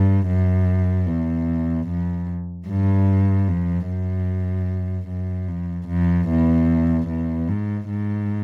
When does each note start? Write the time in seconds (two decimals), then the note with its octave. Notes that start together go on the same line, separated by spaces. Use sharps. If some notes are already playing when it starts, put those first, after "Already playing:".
Already playing: G2
0.27 F#2
1.07 E2
1.88 F2
2.67 G2
3.48 F2
3.88 F#2
5.08 F#2
5.48 F2
5.88 F2
6.29 E2
7.08 E2
7.49 G#2
7.89 G#2